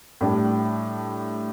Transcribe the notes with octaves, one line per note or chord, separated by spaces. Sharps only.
A2 G3 D4